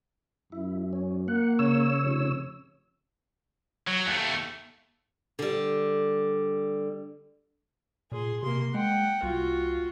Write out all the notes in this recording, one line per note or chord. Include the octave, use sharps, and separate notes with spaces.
F#2 E4
C#4
A#3 F#5
C#3 C#5 E6
F1
F#3
D#2 A3
D3 G3
A#2 G#4 C6
C3 A#3 C6
G#3 F#5 G5
C2 F4 F#4